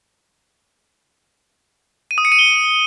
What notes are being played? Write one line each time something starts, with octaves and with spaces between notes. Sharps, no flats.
D#7
D#6
C#7
D#7
G7